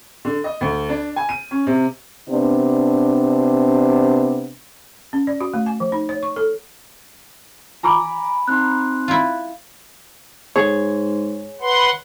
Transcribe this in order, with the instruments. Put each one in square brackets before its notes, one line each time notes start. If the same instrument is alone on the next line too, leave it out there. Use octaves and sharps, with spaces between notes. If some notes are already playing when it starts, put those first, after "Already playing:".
[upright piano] D3
D#5
D2
D4
G#5
D#7
C#4
C3
[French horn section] C3 B3 D4
[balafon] C#4
D5
F#4
A3
G#5
F3
D#4
C#5
C#6
A4
[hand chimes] G#5 [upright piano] A#5 B5 D6
[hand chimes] C4 D#4 C6 [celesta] F#6
[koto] E4 F4
[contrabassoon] G#2 [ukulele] G#4 [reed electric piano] C#5
[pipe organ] B4 F#5 C6